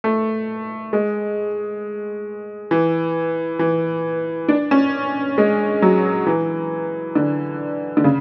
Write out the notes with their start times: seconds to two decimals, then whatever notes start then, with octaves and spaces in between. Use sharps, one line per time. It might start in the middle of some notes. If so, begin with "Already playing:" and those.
0.04 A3
0.93 G#3
2.71 E3
3.59 E3
4.49 D4
4.71 C#4
5.38 G#3
5.82 F#3
6.26 E3
7.15 D3
7.97 D3
8.04 C#3